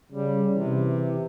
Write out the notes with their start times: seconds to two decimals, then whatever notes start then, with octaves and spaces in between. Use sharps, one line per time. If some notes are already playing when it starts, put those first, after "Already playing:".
0.12 C#3 G3
0.55 C3 E3